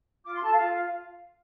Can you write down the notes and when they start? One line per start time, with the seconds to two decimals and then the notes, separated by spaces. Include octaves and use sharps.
0.24 F4 D6
0.33 C6
0.43 A4 A5
0.52 F5
0.61 F4